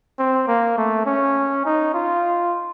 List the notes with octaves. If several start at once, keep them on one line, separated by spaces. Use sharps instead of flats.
C4
A#3
A3
C#4
D#4
F4